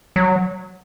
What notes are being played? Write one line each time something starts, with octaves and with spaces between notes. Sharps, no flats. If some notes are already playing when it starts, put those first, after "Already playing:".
F#3